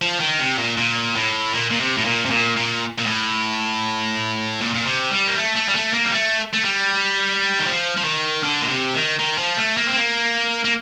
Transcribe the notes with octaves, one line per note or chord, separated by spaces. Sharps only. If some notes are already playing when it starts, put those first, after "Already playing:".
F3
D#3
C3
A#2
A#2
A2
A#2
A#2
C3
A2
A#2
C3
A#2
A#2
A#2
A2
A#2
A#2
C3
G3
A#3
A3
A3
G3
A3
A#3
G3
A3
A3
G3
D#3
F3
F3
D#3
D3
A#2
C3
D#3
D#3
F3
A3
A#3
C4
A#3
A#3